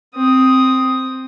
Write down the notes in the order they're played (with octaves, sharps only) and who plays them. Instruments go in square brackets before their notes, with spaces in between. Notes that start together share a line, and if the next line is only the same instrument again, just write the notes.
[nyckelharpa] C4 D#6